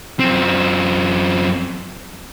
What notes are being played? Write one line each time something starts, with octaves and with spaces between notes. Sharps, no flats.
F#2 C4